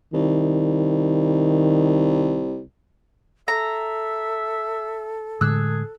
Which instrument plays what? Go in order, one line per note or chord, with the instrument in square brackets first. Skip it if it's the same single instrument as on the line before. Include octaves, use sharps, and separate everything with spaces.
[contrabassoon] C2 [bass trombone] D#3
[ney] A4 [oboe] E5 [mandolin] A#5
[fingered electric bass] A2 D3 G#3 [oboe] G#4 [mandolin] E6 F#6